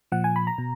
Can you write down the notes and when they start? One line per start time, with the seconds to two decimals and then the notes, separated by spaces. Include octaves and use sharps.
0.12 A#2 F3 F#5
0.24 G#5
0.36 B5
0.47 A#5
0.58 B2